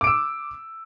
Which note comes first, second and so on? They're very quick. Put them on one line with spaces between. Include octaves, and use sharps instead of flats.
D6 D7 E6